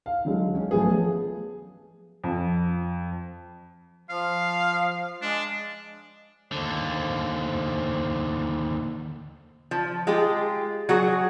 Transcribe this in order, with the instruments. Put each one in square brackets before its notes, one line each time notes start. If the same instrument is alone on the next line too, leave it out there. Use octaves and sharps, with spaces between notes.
[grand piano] F5
D3 F#3 G#3
C#4
F3 F#3 A3 B3 G#4 B4
[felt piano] F2
[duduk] F3 [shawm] F5
[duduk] G#3 [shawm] D4
[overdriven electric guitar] D#2 D3 [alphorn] C5
[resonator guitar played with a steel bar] F3
G#3 F4 G4 G#4
F#3 F#4 G#4